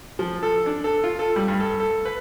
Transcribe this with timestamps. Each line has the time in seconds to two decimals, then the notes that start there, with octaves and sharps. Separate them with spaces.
0.19 F3
0.43 A4
0.66 D4
0.84 A4
1.04 F4
1.19 A4
1.36 G3
1.48 G2
1.60 A4
1.80 A4
2.05 B4